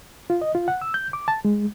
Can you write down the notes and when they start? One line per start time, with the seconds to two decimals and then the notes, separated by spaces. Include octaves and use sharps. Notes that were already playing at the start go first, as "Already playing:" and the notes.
0.30 F4
0.41 D#5
0.55 F4
0.68 F#5
0.82 E6
0.94 G6
1.13 D6
1.28 A5
1.45 G#3